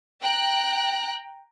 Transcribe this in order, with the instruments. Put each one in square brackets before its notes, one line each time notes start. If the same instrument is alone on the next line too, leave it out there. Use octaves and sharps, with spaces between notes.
[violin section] G5 A#5 F#6